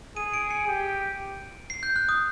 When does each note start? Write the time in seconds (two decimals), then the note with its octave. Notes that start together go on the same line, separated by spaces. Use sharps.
0.17 G#4 D#7
0.34 D7
0.51 C#7
0.67 G4
1.70 C7
1.83 G6
1.96 F#6
2.09 D#6